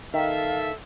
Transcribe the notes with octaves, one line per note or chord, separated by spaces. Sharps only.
D#3 A4 E5 F5